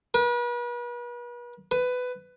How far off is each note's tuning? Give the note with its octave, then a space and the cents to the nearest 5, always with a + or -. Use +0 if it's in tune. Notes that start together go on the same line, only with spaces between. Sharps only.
B4 -40
B4 +15